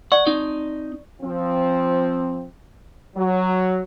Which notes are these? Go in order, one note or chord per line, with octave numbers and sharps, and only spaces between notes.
D5 F#5 C#6
C4 D#4
F3 C4
F#3